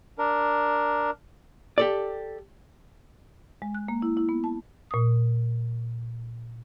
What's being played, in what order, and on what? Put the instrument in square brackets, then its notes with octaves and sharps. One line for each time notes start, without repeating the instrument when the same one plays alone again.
[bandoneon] D4 A#4
[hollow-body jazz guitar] G4 A4 D5
[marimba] G#3
F#6
A#3
E4
E4
B3
A5
A#2 D#6